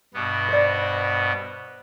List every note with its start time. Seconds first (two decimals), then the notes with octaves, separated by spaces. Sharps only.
0.14 G2 B2 B3
0.48 C5 D5